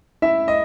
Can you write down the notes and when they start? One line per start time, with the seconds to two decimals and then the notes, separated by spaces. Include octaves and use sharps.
0.22 E4 E5
0.48 D#5